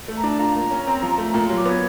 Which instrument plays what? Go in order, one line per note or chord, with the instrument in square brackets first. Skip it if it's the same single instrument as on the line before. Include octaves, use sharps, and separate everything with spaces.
[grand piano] A3
[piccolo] A#5
[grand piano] D4 [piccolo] A5
[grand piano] F4 [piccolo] A#5
[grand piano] A#3
C#4
C4
F3
A3
[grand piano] A#2 [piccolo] A#5
[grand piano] F#3 [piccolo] C6
[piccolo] D6
[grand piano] B3 [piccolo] G#6